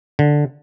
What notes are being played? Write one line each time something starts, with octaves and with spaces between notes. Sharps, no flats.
D3